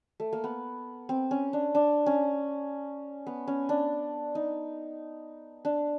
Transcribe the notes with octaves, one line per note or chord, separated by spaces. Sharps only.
A3
A#3
B3
C4
C#4
D4
D4
C#4
B3
C#4
D4
D#4
D4